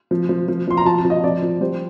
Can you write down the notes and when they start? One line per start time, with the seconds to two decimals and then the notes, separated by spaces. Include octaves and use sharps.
0.11 F3
0.29 F3
0.48 F3
0.68 F3 C6
0.77 A#5
0.86 F3 A5
0.98 A5
1.05 F3
1.10 D#5
1.24 F3 D5
1.42 F3
1.61 G3 C5